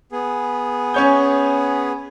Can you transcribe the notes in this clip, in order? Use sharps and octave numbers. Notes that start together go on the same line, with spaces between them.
B3 G#4
C#4 C#5 G6